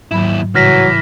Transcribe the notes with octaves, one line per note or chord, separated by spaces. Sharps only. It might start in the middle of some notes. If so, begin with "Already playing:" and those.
D#2 G#2 F#3 E4 B5
A2 C#3 E3 F#3 G3 F6 A#6 B6